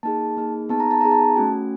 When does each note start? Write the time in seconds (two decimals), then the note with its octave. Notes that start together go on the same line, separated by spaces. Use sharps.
0.03 A#3 D#4 G#4 A5
0.37 A#3 D#4 G#4
0.69 B3 D#4 G#4 A5
0.80 A#5
0.91 A5
1.01 B3 D#4 G#4 A#5
1.11 A5
1.36 A3 C#4 F#4 G#5